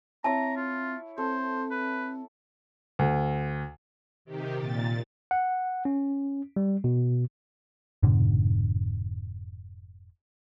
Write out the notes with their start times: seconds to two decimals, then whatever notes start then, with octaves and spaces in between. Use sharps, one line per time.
0.24 C4 E4 C#5 A5 A#5
0.56 F4
1.18 C4 A4 C5
1.71 B4
2.99 D2
4.25 C3 D#3 G4
4.56 A#2 A6
5.31 F#5
5.85 C#4
6.56 G3
6.84 B2
8.03 F1 G#2 B2 D3